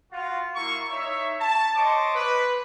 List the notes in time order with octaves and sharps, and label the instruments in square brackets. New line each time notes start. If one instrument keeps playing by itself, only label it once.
[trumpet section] F4 F#4
A#3 E4 C#6
D#4 C#5 E5
A5
C5 C#5 D#5 C#6 D6
B4